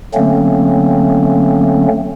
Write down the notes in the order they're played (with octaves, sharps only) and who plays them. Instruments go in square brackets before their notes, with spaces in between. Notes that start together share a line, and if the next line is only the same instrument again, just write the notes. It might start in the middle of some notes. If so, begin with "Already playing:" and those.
[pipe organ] D3 F#3 A3 A#3 C4 C#4